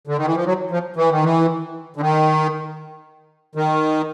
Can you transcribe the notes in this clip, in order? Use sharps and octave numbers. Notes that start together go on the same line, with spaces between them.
D3
D#3
E3
F3
F#3
F3
E3
D#3
E3
D3
D#3
D#3